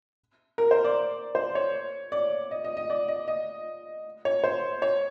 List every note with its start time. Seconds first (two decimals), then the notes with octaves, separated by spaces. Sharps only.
0.58 A#4
0.71 C5
0.84 D5
1.35 C5
1.55 C#5
2.12 D5
2.51 D#5
2.64 D#5
2.77 D#5
2.90 D5
3.08 D#5
3.28 D#5
4.25 C#5
4.44 C5
4.82 C#5